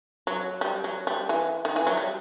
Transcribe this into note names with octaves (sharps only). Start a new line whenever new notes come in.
F#3
G3
F#3
G3
E3
D#3
E3
F#3
G3